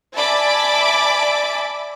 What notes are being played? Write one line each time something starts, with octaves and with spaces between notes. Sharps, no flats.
D5 E5 G#5 A5 B5 D6